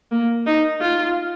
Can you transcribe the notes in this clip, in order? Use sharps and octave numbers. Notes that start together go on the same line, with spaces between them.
A#3
D#4
F4